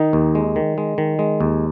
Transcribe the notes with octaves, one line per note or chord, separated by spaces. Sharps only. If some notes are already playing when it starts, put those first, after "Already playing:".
Already playing: D#3 D#4
D#2
G#3
D#3
G#3
D#3
G#3
D#2